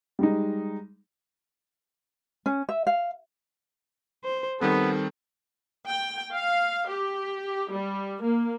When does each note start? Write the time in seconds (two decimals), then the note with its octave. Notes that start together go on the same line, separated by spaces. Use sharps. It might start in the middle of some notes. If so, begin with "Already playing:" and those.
0.19 G3 G#3 D#4
2.46 C#4
2.69 E5
2.87 F5
4.25 C5
4.61 D#3 G3 B3 C4 A4
5.85 G5
6.34 F5
6.89 G4
7.71 G3
8.21 A#3